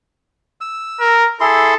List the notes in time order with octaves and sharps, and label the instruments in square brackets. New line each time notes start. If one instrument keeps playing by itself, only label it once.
[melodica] E6
[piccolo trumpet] A#4
[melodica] E4 G#4 C6 [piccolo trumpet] A4